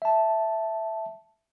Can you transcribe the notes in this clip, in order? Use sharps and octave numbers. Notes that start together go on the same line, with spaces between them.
E5 A5